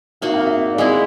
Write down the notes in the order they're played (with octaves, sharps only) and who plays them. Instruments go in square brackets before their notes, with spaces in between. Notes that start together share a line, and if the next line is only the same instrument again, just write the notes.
[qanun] A#3 D#4 F#4 [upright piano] E5
[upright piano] F5
E5
D5
[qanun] G#3 B3 E4 [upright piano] D#5